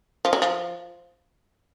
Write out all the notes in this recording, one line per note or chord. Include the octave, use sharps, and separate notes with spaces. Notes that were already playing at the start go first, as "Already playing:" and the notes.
F3
F#3
F3